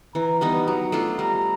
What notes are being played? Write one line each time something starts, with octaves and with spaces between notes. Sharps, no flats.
E3 A#5
G3 B3 D#4
F#3 A#5
A3 D4 F4
G3 A#5